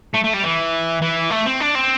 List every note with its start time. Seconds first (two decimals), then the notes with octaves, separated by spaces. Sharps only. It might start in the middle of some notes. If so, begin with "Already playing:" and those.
0.14 A3
0.24 A3
0.34 G3
0.43 E3
1.02 E3
1.30 A3
1.46 C4
1.60 D4
1.75 C4